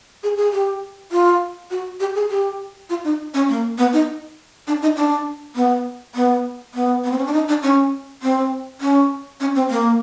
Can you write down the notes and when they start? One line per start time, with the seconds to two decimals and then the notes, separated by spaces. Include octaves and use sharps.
0.23 G#4
0.37 G#4
0.53 G4
1.12 F4
1.71 F#4
2.00 G4
2.15 G#4
2.30 G4
2.90 F4
3.04 D#4
3.34 C#4
3.49 A#3
3.78 B3
3.93 D#4
4.67 D4
4.82 D#4
4.96 D4
5.56 B3
6.15 B3
6.74 B3
7.04 B3
7.11 C4
7.18 C#4
7.26 D4
7.33 D#4
7.48 D4
7.63 C#4
8.22 C4
8.81 C#4
9.40 C#4
9.55 C4
9.70 A#3